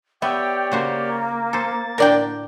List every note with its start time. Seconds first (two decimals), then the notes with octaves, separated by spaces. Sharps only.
0.22 B3 G4 C#5 D5 E5 G5
0.72 C#3 A#3 F#4 C5
1.53 A4 C5 A6
1.98 A2 D3 D4 A#4 D5 G5